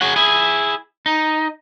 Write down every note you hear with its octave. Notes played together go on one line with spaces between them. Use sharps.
G#4 C#5 F#5
E4 G#4
D#4